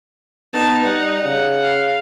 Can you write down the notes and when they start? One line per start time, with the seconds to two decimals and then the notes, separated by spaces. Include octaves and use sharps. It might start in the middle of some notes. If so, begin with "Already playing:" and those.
0.53 B3 D#4 A5
0.84 G3 F#5
1.24 C#3
1.63 F5